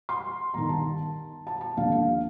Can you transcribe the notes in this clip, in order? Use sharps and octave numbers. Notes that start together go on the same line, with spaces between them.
C6
G1 G2 D#3 A#5
A5
A5
A5
D#2 D3 F3 F5
F5